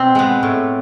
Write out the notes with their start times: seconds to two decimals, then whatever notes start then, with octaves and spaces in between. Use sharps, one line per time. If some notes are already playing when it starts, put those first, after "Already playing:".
Already playing: B2 C4
0.15 G#3 B3
0.43 A2